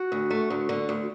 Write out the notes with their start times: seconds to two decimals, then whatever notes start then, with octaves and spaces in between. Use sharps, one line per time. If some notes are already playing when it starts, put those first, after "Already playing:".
Already playing: F#4
0.12 D2
0.31 A3
0.50 D2
0.69 D3
0.89 D2